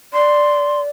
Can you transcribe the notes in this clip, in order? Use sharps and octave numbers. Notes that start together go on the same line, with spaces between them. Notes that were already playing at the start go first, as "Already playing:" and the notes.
D5 C6